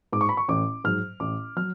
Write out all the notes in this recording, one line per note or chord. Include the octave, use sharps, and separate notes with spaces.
G#2 G#3 D6
C#6
B5
C#6
A1 D6
G#2 F#3 F6
A1 D6
F#3 F6